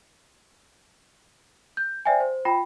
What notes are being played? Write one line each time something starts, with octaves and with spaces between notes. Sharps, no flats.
G6
C5 D5 E5 G5 G#5
C5
F4 G5 B5